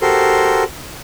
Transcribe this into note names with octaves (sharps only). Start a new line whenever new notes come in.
F#4 G4 A4 A#4 C5 C6